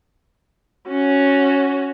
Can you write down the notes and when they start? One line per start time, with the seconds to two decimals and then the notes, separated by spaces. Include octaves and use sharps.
0.88 C#4 F#4